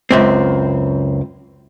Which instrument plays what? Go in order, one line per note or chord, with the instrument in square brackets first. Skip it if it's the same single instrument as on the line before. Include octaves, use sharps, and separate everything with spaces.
[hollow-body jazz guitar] C#2 F#2 C4